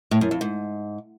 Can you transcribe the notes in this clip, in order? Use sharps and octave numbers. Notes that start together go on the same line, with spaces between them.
A2
F#2
F2
G#2